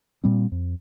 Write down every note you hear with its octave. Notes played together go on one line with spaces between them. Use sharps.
A#2 G3 C4
F2